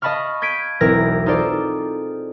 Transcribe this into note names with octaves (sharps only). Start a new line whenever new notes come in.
D#5 F5 A5 B5 C#6 F6
G6 G#6 B6 D7 D#7
E1 B1 C4 E4 A#4 A#6
D#4 F4 G#4 A4 C5 D5